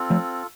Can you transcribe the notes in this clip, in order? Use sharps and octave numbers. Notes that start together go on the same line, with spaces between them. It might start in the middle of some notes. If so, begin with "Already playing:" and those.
Already playing: C4 F4 A4
F3 A3